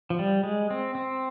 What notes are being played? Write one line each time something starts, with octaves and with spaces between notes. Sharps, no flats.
F3
G3
G#3
C4
C4